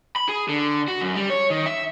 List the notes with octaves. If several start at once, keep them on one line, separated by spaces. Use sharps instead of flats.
B5
G#4
D3
F#4
F#2
G3
C#5
D#3
E5